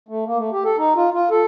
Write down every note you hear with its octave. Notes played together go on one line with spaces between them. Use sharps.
A3
A#3
A3
G4
A4
D#4
F4
F4
A4